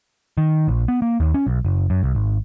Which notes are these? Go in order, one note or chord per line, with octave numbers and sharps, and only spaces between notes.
D#3
A#1
B3
A#3
D#2
C#4
B1
F#1
F#2
C2
G#1